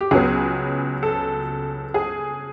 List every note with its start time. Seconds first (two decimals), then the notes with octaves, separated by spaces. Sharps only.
0.01 G4
0.11 C#2 C#3 F#3 B3 G#4
1.03 A4
1.94 G#4